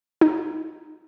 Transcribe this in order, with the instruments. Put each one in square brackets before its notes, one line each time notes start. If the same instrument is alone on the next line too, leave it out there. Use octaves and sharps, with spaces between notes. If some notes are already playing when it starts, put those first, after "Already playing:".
[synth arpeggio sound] D#4